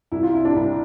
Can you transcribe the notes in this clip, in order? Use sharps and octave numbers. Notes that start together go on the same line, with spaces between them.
C2 E4
F4
C3 E4
D4
C2